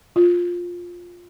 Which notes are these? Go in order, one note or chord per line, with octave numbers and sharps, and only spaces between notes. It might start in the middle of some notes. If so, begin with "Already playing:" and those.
F4